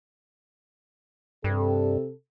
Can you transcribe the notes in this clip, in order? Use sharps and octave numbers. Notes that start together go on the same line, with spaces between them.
G2 C3 A4